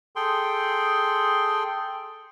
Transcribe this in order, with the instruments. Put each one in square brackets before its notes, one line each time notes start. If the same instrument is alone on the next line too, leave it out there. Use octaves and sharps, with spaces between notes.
[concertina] G#4 A4 G5 C6